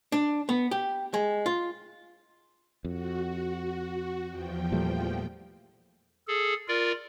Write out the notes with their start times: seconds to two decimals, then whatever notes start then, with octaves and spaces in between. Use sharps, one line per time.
0.12 D4
0.49 B3
0.71 G4
1.14 G#3
1.46 F4
2.85 F2 F#4
4.28 E2 F3 G5
4.72 A#2 G3 A3
6.28 G#4 A4
6.68 F4 A#4 D5